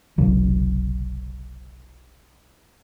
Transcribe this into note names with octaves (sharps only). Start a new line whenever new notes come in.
F1 B1 C#3 F#3